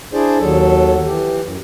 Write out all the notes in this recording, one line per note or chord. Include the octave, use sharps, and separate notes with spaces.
D4 E4 G#4 C5 D5
D#2 F#3 A4
E3 G4
F#2